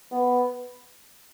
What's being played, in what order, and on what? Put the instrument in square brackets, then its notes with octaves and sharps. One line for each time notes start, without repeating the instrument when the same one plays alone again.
[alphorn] B3